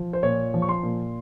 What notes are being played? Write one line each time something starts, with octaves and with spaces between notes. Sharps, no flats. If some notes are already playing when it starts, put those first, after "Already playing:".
Already playing: F3
C5
A#2 C#5
F3
C#6
C6
A#2